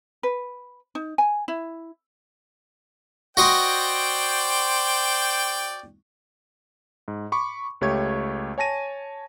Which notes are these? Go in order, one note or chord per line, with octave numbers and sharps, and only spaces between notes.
B4
D#4
G#5
E4
F#4 C5 D5 D#5 G5 C6
G#2
B5 C#6 D6
C#2 A3 G4 C#5 C#6 G#6
C#5 G#5 A5 A#6 D#7